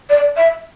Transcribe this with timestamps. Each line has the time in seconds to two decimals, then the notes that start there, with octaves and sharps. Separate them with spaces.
0.10 D5
0.36 E5